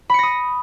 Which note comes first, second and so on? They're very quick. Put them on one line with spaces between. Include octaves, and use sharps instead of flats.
B5 C#7 A#6 D#6